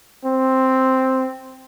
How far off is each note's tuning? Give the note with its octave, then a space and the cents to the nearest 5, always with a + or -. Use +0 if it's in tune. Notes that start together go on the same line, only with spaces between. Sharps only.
C4 +0